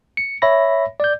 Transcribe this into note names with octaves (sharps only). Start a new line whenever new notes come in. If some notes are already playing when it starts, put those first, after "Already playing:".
C#7
C#5 E5 B5 A#6
D5 G6